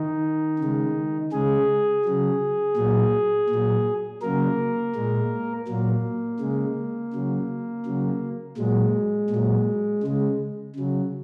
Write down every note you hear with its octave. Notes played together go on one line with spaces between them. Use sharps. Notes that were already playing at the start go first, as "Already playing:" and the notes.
Already playing: D#3 D#4
C#3 G#3
C#3 G#3 G#4
C#3 F#3
A#2 F#3
A#2 F#3
C#3 F#3 A#3 A#4
A#2 G#3
A#2 F#3 A#3
C#3 G#3
C#3 F#3
C#3 F#3
A#2 F#3 G#3
A#2
F#3
C#3 G#3
C#3 F#3